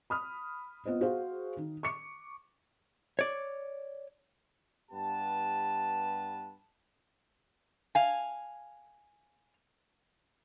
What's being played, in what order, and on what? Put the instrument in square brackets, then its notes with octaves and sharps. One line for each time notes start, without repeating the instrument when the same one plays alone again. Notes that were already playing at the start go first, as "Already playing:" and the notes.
[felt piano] B5 D#6 F6
B3 F4 C5 D#5
F#4 G#4 C5 F5
D#3
C#6 D6 C#7
[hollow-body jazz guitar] C#5 D5
[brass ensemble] G2 B3 G4 B4 A5
[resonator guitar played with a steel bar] F5 G#5